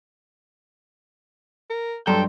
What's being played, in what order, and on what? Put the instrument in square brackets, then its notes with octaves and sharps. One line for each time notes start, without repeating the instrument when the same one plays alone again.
[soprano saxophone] A#4
[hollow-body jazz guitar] G2 A#5 [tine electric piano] F#3 C6 [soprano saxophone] A4 [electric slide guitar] G5